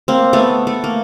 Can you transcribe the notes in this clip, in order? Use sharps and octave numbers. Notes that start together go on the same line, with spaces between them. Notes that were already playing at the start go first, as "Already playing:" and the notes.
A#3 C4
A3 B3
A3
A#3